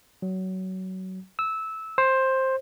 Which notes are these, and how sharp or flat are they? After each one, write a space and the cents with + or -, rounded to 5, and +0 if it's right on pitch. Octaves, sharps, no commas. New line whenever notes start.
F#3 +20
E6 -15
C5 +10